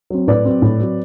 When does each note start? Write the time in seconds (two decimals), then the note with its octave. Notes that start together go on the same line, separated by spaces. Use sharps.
0.10 F#3 C4
0.27 A2 B4 D5
0.45 F#3 C4
0.62 A2
0.80 F#3 C4